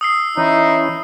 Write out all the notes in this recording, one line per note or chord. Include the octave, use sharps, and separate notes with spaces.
D#6 E6 C7
E3 C#4 D#4 E4